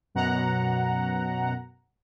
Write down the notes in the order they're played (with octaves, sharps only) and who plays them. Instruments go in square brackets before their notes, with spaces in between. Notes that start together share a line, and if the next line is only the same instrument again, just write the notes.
[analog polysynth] F#2 B2 F#5 A#5